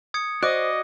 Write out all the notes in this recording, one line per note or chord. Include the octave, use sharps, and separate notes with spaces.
D#6 G#6 C#7
F#4 C5 D5 D#5 D6 F#6